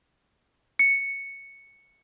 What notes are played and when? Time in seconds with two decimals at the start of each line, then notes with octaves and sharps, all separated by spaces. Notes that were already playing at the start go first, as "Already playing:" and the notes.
0.79 C#7